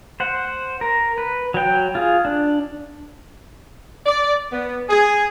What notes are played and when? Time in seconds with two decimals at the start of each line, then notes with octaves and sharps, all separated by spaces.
0.20 C5 F#5
0.81 A#4
1.18 B4
1.54 F#3 G5
1.95 F4 G#4
2.25 D4
4.05 D5
4.51 B3
4.90 G#4